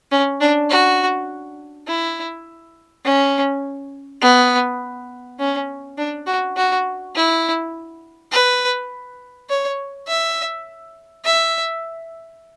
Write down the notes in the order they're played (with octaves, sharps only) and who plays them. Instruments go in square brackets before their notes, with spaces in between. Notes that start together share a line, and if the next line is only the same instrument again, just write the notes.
[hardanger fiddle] C#4
D4
F#4
E4
C#4
B3
C#4
D4
F#4
F#4
E4
B4
C#5
E5
E5